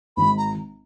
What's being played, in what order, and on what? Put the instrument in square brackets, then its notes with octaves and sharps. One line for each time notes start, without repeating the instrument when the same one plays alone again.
[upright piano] G#1 [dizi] B5
[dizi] A#5